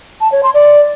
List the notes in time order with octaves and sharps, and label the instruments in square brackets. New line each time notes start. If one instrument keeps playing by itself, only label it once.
[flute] A5
C#5
C6
D5